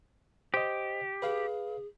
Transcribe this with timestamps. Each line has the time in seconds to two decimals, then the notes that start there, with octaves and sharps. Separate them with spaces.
0.54 G4 C5 D#5
1.22 G#4 B4 F5